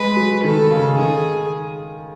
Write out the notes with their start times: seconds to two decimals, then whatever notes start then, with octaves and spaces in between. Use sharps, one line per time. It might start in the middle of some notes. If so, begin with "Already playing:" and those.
Already playing: G#3 B4
0.16 F#3
0.44 D#3 A4
0.71 C#3
0.98 D#3 G#4